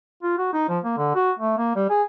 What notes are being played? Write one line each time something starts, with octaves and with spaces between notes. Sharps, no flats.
F4
F#4
D#4
F3
A#3
D3
F#4
A3
A#3
G3
G#4